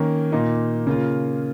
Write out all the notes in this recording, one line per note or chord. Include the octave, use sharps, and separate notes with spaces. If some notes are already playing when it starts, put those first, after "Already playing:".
Already playing: D#3 A#3 C#4
A#2 A#3 D#4
C#3 A#3 F4